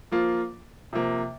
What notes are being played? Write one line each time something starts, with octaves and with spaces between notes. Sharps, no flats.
F3 A#3 F4
C3 F3 A#3